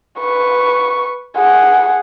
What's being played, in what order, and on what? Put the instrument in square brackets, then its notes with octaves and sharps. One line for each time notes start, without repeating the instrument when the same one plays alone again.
[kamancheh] B4 C#6
G#4 F#5